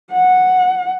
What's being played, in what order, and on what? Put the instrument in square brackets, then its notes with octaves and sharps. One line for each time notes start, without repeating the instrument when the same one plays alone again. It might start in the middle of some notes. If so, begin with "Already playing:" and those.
[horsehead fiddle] F#5